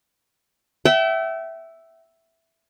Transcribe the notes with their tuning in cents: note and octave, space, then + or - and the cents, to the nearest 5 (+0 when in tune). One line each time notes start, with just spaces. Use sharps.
E5 +0 G5 -40